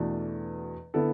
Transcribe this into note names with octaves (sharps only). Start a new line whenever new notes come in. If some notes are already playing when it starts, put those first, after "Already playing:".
Already playing: E2 B2 A3 D4 A4
D3 B3 E4 A4